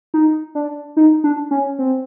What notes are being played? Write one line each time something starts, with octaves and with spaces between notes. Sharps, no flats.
D#4
D4
D#4
D4
C#4
C4